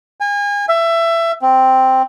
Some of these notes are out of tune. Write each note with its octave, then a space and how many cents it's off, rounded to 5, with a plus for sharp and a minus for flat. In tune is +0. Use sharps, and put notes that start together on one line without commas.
G#5 -35
E5 +20
C4 +0